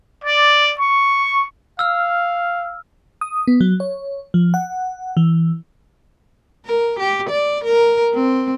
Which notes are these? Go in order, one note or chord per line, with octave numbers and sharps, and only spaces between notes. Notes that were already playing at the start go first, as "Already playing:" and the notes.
D5
C#6
F5 E6 F6
D#6
B3
F#3
C#5
F3
F#5
E3
A#4
G4
D5
A#4
C4